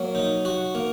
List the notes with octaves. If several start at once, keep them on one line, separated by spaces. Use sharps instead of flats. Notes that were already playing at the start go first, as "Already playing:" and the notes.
Already playing: F#3 A#3
D#4
F#4
A#3